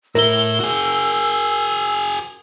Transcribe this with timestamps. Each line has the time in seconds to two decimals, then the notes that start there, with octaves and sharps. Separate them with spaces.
0.15 A2 E4 A#4 E6 G7
0.60 F#4 G#4